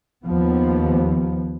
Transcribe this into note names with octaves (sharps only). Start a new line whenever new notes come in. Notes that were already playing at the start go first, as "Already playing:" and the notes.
D#2 F3 B3